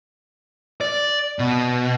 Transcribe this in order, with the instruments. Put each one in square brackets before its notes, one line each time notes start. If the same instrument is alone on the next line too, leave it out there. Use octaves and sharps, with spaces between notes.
[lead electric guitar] D5
B2